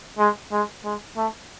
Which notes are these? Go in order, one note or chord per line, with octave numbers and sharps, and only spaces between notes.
G#3
G#3
G#3
A3